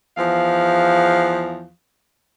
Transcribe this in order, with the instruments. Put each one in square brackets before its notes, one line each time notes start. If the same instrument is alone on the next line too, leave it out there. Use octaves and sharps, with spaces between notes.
[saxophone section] E2 F3 F5